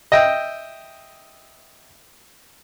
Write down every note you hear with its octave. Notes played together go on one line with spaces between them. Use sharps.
D#5 E5 G5